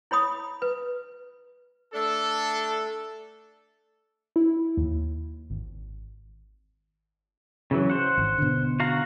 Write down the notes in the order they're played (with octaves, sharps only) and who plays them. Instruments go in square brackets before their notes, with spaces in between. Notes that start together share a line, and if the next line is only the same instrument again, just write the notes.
[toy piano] E4 C#5 B5 D#6
B4
[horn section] A3 D4 A4
[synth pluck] E4
D#2
G#1
[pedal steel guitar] C#3 E3 F#3
C5 F#5
[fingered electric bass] G#1
B2 D3
[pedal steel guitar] F#4 F5 A#5